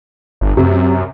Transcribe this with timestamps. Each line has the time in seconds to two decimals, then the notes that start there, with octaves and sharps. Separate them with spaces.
0.41 G1
0.57 F#2 C3